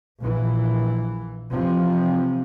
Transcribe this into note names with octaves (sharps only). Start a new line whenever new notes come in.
A#1 E3
C3 E3 F3 C4